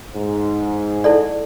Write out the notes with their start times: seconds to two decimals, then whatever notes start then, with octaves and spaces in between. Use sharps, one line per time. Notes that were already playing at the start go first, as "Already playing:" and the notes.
0.14 G#2
1.04 E4 A4 D5